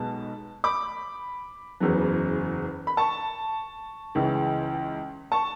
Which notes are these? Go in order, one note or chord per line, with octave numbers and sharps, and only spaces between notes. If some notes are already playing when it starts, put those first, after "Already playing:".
Already playing: B1 B2 G#3 B3 A5
B5 D6
F#1 E2 C#3 F#3 B3
B5
A5 C#6
C#2 C#3 E3
A5 C#6